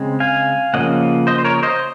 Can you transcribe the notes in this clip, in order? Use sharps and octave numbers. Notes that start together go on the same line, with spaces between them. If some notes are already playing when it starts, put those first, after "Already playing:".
Already playing: C#3 G#3 C4
F5 G#5
C#3 F3 A#3 C#4 D#5 F#5
C5 D#5
C5
A#4 C#5
C5 D#5